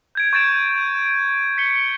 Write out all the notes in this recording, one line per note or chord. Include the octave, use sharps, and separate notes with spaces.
G6 G#6 D7
C#6 G6 A6 D7 E7
E7
D7
B6 C#7 G7